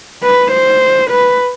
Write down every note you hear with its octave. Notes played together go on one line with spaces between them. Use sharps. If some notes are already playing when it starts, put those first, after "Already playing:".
B4
C5
B4